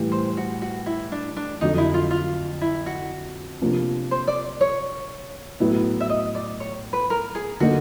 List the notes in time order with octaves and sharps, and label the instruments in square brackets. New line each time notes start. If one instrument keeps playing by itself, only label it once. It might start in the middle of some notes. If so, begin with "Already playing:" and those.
Already playing: [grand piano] A2 E3 G3
[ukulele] C5
F#4
F#4
E4
D4
D4
[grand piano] F2 D3 F#3 [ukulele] D#4
[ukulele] E4
F4
F4
E4
F#4
[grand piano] C3 F3 A#3 D4 F4
[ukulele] C5
D5
C#5
[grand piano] A2 F#3 B3 E4
[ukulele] E5
D#5
D5
C#5
B4
A#4
G#4
[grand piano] D3 F#3 A#3 D#4 [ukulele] F#4